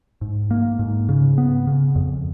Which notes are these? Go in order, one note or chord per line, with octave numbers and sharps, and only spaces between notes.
G#2
A#3
G#2
C#3
B3
C#3
F2